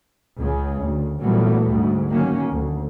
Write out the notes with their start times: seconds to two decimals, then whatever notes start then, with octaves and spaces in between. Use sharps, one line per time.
0.36 C#2 C#3
0.81 D2
1.21 A#2 E3 F#3 G3 A3 B3
1.70 D2 G#2
2.09 D#3 F#3 A#3 C#4
2.51 D2